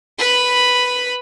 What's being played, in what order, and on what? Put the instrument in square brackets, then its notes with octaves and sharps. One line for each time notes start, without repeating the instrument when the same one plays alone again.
[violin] B4 B5